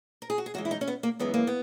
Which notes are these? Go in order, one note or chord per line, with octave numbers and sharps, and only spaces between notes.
A#4
G#4
F#4
G#4
F#2 E3 G#3 F#4
E4
D#4
C#4
B3
A#3
F#2 E3 G#3 B3
A#3
B3